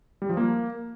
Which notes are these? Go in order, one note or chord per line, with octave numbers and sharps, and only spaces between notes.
G3
F3
A#3